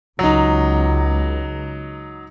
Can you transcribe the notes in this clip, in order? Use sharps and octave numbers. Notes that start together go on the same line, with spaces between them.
C#2 F#3 D#4